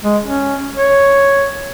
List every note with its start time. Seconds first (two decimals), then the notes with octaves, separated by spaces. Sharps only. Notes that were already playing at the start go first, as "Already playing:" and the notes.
0.03 G#3
0.23 C#4
0.76 C#5